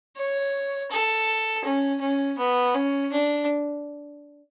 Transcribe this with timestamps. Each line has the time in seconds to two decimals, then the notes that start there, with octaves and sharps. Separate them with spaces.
0.16 C#5
0.91 A4
1.64 C#4
2.01 C#4
2.38 B3
2.74 C#4
3.12 D4